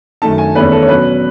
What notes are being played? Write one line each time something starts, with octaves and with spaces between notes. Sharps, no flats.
F#2 D#3 A3 D#4 A5
G#5
E2 D#3 A3 C#4 B4
A4
C#5
B2 F#3 C#4 B4